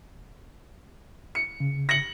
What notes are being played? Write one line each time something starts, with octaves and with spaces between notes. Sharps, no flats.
C#7
C#3
A#6 C#7 F#7